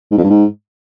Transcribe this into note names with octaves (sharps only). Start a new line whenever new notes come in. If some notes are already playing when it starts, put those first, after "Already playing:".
G#2
F2
G2
G#2